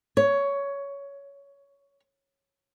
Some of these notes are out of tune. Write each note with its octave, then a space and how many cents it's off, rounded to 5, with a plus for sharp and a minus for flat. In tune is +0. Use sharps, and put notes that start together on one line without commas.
C#5 +15